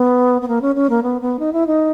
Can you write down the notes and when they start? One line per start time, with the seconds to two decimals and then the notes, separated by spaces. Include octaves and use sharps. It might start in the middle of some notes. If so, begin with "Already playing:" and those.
Already playing: B3
0.42 B3
0.48 A#3
0.62 C#4
0.76 C#4
0.90 A#3
1.03 B3
1.21 B3
1.39 D#4
1.53 E4
1.67 D#4